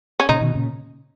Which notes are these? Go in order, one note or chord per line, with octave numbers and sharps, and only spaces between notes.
C#4
A#2 C#3 D#4
B2 D#3
A#2 C#3